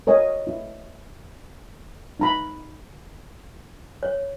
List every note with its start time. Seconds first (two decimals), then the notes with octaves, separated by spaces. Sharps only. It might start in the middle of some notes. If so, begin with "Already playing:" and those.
0.07 A#4 C#5 D#5 G#5
0.47 E4
2.20 D#4 A#5 B5
4.03 C#5